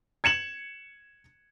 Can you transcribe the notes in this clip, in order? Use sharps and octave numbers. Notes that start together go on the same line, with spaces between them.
G#6 C#7 E7 F#7